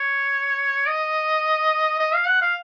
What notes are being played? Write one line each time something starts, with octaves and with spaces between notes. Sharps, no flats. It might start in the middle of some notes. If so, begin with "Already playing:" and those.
Already playing: C#5
D#5
D#5
F5
F#5
F5